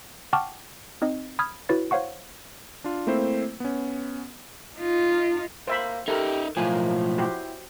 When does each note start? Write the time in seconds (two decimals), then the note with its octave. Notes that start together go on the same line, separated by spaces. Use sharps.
0.33 F#5 G5 A5 C#6 D6 F6
1.02 C4 D#4 D#5
1.39 B5 D#6 F6 G#6
1.69 E4 F#4 B4 C#5 A6
1.91 C5 C#5 F5 F#5 C#6
2.84 D4 F4
3.07 A3 A#3 C4 E4 C5
3.60 B3 C#4
4.77 D#4 F4
5.67 A#3 C5 E5 B5
6.08 D#4 G4 A4 A#4 E5
6.57 B1 A2 F3 A#3 G#5
7.18 E4 F#4 G4 C5